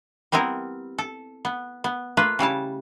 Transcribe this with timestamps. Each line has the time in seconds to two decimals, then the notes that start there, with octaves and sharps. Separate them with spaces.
0.32 G3 B3 C4 E4 A#4
0.98 A4
1.45 B3
1.84 B3
2.17 A3 A#3 F4 B4
2.39 C#3 G3 E4 A5